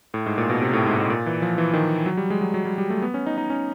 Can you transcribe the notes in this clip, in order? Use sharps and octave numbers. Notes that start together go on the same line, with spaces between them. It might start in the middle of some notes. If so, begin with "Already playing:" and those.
A2
G#2
A#2
B2
C3
A2
G#2
A2
A#2
E3
F3
E3
D#3
F#3
G3
G#3
F#3
F#3
G3
G3
A3
B3
C#4
D#4
D#4
C#4